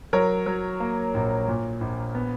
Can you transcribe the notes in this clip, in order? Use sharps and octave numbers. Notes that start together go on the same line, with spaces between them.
F#3 A#4 C#5
F#3
A#3
A#1
A#2
A#1
B3